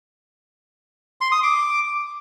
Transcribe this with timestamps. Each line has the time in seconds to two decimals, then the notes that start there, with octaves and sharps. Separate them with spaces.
1.21 C6
1.32 D#6
1.43 D6